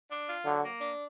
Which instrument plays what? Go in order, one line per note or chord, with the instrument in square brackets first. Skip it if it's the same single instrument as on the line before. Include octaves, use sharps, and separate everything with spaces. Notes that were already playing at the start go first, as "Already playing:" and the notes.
[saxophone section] D4
F4
[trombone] D3 [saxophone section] F#3
[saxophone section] A#3
D4